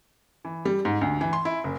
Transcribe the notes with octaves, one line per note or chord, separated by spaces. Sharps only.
E3
G3
G#2
D2
E3
C6
E4
F#1